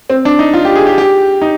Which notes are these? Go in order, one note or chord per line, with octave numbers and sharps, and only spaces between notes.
C4
D4
D#4
F4
G4
G#4
G4
G4
D#4